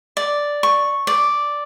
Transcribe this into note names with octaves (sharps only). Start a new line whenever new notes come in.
D5
C#6
D5